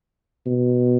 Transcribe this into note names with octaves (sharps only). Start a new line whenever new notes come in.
B2